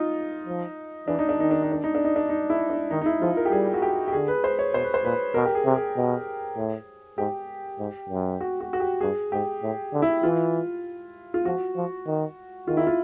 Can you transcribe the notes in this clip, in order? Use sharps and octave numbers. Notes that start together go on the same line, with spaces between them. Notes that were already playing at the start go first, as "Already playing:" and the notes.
Already playing: D#4 F4
F3
E3 D4
D#4
D4
D#3 D#4
D4
D#4
D4
D#4
D4
D#4
D4
D#4
E4
D4
D#3 D#4
D#4
E4
F3 F4
A#4
G4
G3 G#4
F#4
G4
G4
D3 G#4
B4
C5
C#5
B2 C5
B4
C5
A#2 B4
B2 A#4
G4
G#4
C3
G#4
B2
A2
G#2 G4
G#2
F#2
F#4
F#4
F#4
G4
G2 G#4
G#2 G4
A2
D3
E4
E3 F4
F4
F3 F#4
F3
D#3
D#3 F4
E4
F4